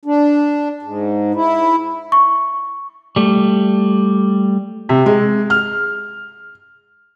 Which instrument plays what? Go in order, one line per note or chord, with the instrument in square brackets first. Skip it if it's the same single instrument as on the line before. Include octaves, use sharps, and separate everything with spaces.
[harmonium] D4
G#2
E4
[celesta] C#6
[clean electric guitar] G3 A3
[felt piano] C3
G#3
F6